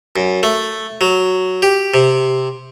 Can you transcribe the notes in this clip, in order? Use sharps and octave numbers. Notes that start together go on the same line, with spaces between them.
F#2
A3
F#3
G4
C3